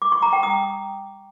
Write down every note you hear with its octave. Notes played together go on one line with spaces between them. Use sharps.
D6
C#6
A#5
G5
D#6